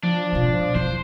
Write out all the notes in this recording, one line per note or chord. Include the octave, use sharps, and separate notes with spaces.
F3 D4
G#2 B2
E2 C5